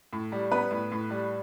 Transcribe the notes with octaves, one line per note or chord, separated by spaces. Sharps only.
A2
G3
B3 B4
A2
A2
G3